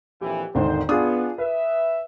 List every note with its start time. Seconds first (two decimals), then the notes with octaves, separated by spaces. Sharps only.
0.21 A#1 F2 E3 G4
0.55 G#1 D#2 G#2 D3 D#3 C5
0.89 B3 D4 F4 G#4 D#6
1.38 B4 E5